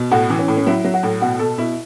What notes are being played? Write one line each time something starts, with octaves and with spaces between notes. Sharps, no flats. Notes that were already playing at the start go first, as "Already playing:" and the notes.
Already playing: B2
A2 F#4
E3
C#4
A2
C#4
F#3 E4
F#3
F#4
A2
B2 F#4
B2 A4
B2 E4